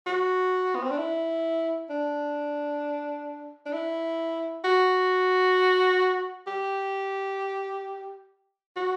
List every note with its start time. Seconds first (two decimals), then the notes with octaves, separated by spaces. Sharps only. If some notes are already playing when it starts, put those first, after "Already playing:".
0.06 F#4
0.75 B3
0.83 C4
0.90 D4
0.98 E4
1.90 D4
3.66 D4
3.73 E4
4.64 F#4
6.47 G4
8.76 F#4